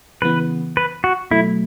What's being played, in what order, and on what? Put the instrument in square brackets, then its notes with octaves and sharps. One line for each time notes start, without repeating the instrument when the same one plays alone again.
[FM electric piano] C#3 E3 B3 [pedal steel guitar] B4
[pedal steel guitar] B4
F#4
[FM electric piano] B2 F#3 A3 [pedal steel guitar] E4